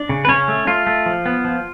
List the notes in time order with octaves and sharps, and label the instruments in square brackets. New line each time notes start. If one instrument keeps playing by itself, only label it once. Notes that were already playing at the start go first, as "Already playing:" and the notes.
Already playing: [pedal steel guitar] D4 D5
C#3
B4
C#3 C#4 C#5
A3
A3 F4
A3
F3
B3
F3